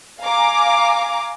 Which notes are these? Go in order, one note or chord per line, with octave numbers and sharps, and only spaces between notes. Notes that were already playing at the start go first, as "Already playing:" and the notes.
F5 G#5 A#5 D6